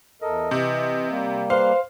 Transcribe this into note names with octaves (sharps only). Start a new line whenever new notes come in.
E2 A4 A#4 D#5
C3 E3
G3 A#3
B4 C5 F5